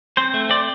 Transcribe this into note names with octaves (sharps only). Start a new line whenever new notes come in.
C4 C5
A3
C4 D5